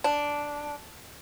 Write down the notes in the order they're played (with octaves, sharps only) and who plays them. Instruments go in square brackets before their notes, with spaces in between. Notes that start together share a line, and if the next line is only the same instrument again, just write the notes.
[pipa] D4